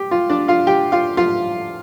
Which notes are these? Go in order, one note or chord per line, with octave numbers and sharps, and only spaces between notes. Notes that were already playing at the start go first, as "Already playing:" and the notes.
Already playing: G4
F4
D4 D5
F4 F5
G4 G5
F4 F5
F4 F5